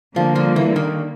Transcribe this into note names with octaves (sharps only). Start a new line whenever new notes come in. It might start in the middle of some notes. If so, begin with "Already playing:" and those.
D3 F3 G3 A#3
F3
E3
D#3